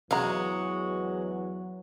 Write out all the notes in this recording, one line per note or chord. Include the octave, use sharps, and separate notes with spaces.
E2 E3 F#3 G#3 F#4 F5 A#5